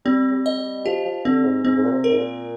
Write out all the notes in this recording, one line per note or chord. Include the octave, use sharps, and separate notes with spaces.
G3 C4
G3
D#5
G3
F3 G4
F3
D3 C4
G#2
G#2 C4
G#2
A#2
C3
A#4
G#2
A#2